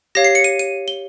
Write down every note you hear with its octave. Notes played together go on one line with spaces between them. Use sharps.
G4 C#5 F5 A#6
C7
C#7
D#7
D#7
G7